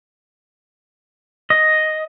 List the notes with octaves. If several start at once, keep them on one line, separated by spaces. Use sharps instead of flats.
D#5